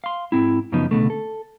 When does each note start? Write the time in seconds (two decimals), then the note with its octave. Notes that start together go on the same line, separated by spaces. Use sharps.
0.04 F5 C6
0.32 G#2 C4 E4
0.72 F#2 C#3 F3 B3 D#4
0.91 C#2 B2 D3 A3
1.10 A4